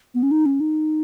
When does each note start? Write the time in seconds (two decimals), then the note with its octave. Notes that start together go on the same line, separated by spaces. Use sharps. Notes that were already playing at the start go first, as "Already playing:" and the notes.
0.15 B3
0.23 C#4
0.31 D#4
0.46 C#4
0.60 D#4